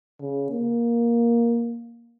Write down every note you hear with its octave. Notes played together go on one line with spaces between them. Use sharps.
C#3
A#3